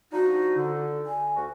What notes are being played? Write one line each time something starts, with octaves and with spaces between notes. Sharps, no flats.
F3 D4 D#4 F#4
D3
G#5
D2 F#4